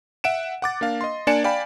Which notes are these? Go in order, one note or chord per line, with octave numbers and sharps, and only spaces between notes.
E5 F#5 D7 E7
F#5 D6 A6
A#3 D4 F5
D#5 C6
A#3 D4 D5 G#5 C#7 E7
D5 F5 G5 G#5 B5